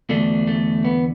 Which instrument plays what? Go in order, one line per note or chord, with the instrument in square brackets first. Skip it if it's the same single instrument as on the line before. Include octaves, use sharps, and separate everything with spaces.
[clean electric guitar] E2 D3 A3 D4
A3
B3